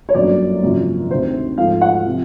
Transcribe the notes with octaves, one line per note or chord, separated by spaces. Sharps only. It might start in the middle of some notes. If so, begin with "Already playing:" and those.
C#5
G1 F#2 D3 F#3 A#3 D5
G#1 F#2 C#3 F3 A#3
D2 C3 D#3 C5
G#2 F3 A3 F5
F#5
C3 F3